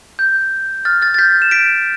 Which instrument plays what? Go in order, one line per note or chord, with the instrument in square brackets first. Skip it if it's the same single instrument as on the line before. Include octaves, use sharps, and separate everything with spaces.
[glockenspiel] G6
F6 A6
F6 A6
A6
G6 B6
E7
B6 D7